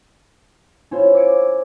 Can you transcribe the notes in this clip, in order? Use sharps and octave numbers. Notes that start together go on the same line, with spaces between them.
C#4 E4 F4 C5
D6 E6 G#6 C#7 D7